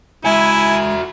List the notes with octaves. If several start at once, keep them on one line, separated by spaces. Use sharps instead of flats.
C#2 G#3 E4 F#4 E5 G#5 B5